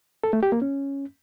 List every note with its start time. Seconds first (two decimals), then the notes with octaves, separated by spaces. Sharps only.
0.24 A4
0.33 A3
0.43 G4
0.52 A#3
0.62 C#4